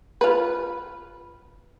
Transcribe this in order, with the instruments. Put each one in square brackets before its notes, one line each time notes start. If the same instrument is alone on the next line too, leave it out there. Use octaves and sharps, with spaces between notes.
[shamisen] F4 B4